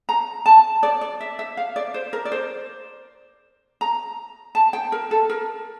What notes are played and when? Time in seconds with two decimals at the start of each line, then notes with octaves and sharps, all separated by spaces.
0.09 A#5
0.46 A5
0.83 D5
1.01 D5
1.21 E5
1.39 E5
1.57 F5
1.76 D5
1.94 C5
2.13 A#4
2.25 D5
2.32 C5
3.81 A#5
4.55 A5
4.73 G5
4.92 A#4
5.11 A4
5.30 A#4